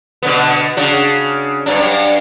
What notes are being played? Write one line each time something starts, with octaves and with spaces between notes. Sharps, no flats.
B2 D3 B3
C#3 D4 F#4
G2 F#3 D4